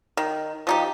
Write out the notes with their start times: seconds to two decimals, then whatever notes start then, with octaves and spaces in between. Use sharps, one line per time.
0.17 D#3
0.67 F3 D#4 G4